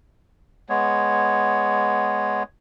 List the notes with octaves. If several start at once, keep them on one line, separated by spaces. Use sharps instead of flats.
G#3 B3 C#5